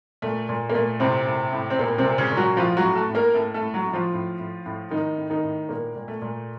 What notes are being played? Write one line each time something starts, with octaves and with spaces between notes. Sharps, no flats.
A#2 A3
A#2
A#3
A#2 A3
A2 C3 C4
A2
A2
C4
A#2 A#3
C3 C4
A#2
C#3 C#4
A#2
F#3 F#4
A2 F3 F4
F#3 F#4
A2
A3 A4
A2
A#3 A#4
A2 A3 A4
A3 A4
A2
F#3 F#4
A2
F3 F4
A2
A2
A2
A2 D#3 D#4
A2
D#3 D#4
A2
A#2 A#3
A#2
A3
A#2